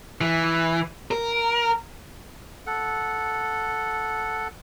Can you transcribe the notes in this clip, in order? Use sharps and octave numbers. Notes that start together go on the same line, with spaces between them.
E3
A#4
A4 F#5